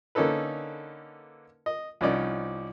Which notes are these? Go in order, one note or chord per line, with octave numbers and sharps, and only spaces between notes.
D3 A#3 C#4 D#4 A4 B4
D#5
C2 F3 C#4 D#4 D5